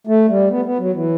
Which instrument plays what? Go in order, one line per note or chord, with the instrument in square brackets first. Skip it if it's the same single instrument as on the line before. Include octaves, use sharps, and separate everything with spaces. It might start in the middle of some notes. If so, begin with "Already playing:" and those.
[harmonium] A3
G3
B3
B3
F#3
E3